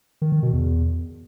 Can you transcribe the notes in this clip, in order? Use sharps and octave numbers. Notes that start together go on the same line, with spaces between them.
D#3
D#3
B2
E2